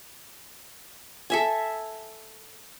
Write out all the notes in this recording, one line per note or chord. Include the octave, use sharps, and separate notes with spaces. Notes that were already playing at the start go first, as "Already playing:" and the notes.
A4 E5 G#5